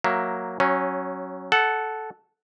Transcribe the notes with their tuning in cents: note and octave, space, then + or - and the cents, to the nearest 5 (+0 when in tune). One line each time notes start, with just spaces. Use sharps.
F#3 +0 A#3 +0 E5 +15
F#3 +10 C#4 -15
A4 -10 F#5 +5